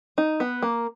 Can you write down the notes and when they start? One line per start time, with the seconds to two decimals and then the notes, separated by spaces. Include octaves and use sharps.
0.18 D#4
0.40 B3
0.62 A#3